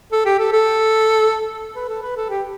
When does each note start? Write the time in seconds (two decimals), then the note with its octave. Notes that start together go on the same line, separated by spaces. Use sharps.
0.12 A4
0.25 G4
0.39 A4
0.53 A4
1.76 B4
1.89 A4
2.02 B4
2.16 A4
2.29 G4